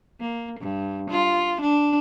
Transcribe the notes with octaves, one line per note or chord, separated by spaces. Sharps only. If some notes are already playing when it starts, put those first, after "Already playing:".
A#3
G2
F4
D4